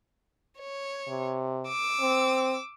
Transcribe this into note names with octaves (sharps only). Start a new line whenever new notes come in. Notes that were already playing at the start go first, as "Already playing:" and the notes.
C#5
C3
D6 E6
C4